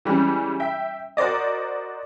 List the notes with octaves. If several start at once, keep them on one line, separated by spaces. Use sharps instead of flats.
E3 G3 G#3 C#4
E5 G5
F#4 A#4 C5 D5 D#5